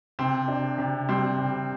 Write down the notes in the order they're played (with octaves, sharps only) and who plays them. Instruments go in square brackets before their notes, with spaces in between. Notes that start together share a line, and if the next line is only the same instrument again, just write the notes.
[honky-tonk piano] C3 [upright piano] C4
[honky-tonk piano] D4
C3
[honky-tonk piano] G3 [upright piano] C4
[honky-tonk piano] C3